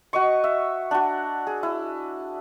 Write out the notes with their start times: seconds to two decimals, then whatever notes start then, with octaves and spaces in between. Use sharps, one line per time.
0.13 F#4 D#5 C#6
0.44 E5
0.91 D4 F#4
1.47 G#4
1.63 E4